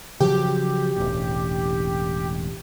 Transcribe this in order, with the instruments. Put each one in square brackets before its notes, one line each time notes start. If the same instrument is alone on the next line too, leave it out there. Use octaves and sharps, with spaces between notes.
[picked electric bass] C#3 F3 F#3 [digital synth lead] G4
[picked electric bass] E1 A1